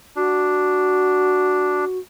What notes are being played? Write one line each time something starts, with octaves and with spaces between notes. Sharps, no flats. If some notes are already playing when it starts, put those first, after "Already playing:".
D4 F#4